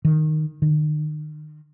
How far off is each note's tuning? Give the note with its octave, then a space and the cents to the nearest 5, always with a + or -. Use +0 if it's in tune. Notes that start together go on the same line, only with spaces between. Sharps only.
D#3 -10
D#3 -40